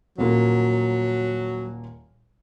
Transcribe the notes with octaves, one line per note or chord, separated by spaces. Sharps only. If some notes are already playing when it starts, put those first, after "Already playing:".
D#1 F#3 A#3 F4